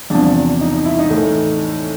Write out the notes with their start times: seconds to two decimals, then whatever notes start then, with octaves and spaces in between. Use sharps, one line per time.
0.10 E2 C3 F3 D4
0.61 D#4
0.73 D#4
0.85 E4
0.99 D#4
1.10 A2 E3 A3